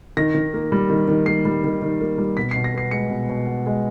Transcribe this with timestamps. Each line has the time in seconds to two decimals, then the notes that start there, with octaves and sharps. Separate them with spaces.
0.17 D#3 A#6
0.35 D#3
0.54 A#3
0.72 G3
0.90 D#3
1.08 D#3
1.26 A#3 C7
1.45 G3
1.64 D#3
1.82 D#3
2.01 A#3
2.18 G3
2.37 B2 B6
2.51 C7
2.56 B2
2.64 A#6
2.74 B3 C7
2.91 G#3 C#7
3.10 B2
3.29 B2
3.47 B3
3.66 G#3